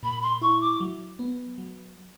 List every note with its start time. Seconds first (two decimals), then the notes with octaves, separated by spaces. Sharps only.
0.03 A#2 B5
0.22 C6
0.41 E4 C#6
0.61 D6
0.80 F#3
1.19 B3
1.58 F#3